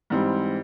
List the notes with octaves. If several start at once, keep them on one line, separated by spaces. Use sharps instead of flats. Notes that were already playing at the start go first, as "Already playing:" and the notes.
G#2 E3 G3 C4